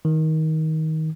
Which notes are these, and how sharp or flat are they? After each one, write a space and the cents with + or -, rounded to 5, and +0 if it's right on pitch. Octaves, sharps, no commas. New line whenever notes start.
D#3 +20